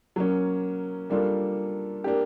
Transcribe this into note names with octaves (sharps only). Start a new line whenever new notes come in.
F#3 A#3 C#4
G3 A#3 D4 F4 A4
A#3 D4 G4